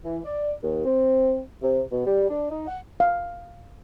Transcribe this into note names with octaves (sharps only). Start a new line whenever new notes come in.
E3
D5
D#2
C4
C3
B2
G3
D4
D#4
F#5
F5